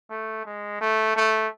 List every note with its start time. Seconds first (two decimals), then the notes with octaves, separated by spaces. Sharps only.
0.10 A3
0.46 G#3
0.81 A3
1.16 A3